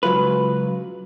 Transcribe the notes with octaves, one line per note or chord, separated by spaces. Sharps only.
C#2 F#3 F4 B4